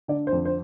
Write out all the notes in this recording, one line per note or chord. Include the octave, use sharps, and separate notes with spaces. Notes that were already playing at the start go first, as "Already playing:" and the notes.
D3 D5
C5
F2
C5